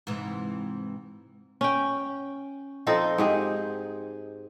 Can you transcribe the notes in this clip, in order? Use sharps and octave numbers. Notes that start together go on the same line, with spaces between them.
G#2 C3 E3
C#4 G5
F3 C4 D#4 A4
G#2 G4 G#4